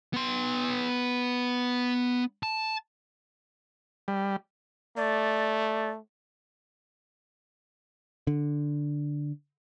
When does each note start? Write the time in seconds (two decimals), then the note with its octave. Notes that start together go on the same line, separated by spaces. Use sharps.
0.14 B3 C6
2.43 A5
4.08 G3
4.97 A3 D5
8.27 D3